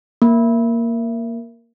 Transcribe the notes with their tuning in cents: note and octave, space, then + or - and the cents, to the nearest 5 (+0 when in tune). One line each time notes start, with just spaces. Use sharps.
A#3 +0